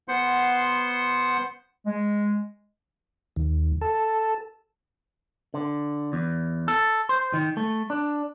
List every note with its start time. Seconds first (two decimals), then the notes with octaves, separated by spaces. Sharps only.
0.08 B3 C5 F#5 C6
1.86 G#3
3.36 D#2
3.81 A4
5.54 D3
6.13 E2
6.68 A4
7.09 C5
7.34 D#3
7.57 A3
7.90 D4